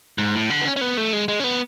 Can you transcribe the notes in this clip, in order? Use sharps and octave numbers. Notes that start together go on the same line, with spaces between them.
G#2
A2
D3
B3
C#4
C#4
B3
A3
G#3
G#3
C#4
B3